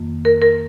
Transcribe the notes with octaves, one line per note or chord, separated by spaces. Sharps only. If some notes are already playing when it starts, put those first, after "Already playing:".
Already playing: F2 D#3 A#3
A#4
A#4